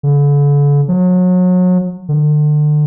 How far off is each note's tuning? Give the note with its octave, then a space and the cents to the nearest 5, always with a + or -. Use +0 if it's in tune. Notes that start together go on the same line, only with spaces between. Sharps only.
D3 -40
F#3 -30
D3 +35